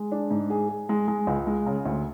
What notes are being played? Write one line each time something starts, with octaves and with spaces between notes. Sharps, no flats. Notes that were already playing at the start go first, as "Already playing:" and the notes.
Already playing: G#3
D4
G#2
G#4
G#4
G#3
G#3
C#2
G#3
C#3
D2